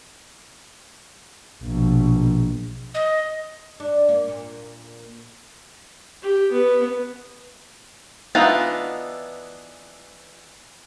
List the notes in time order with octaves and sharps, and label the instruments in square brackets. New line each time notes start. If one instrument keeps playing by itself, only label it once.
[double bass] A#1 B2
[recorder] D#5
[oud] D4
A#3
A#2
[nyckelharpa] G4
B3
[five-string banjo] E3 B3 D4 D#4 F4